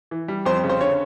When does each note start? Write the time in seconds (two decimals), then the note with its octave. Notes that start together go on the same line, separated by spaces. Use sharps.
0.11 E3
0.28 G3
0.46 F2 C5
0.64 C#3
0.70 C5
0.80 D3 C#5